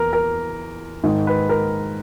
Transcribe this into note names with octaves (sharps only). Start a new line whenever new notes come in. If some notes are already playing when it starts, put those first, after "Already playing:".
Already playing: E2 A#4
A#4
G#2 D#3
B4
A#4